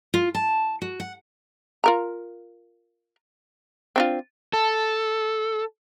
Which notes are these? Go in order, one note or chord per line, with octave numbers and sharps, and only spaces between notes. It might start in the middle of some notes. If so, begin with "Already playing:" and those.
F4
A5
F#4
F#5
F4 A#4 A#5
C4 D4 F4
A4